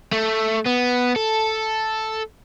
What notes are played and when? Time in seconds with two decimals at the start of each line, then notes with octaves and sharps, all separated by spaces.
0.12 A3
0.66 B3
1.16 A4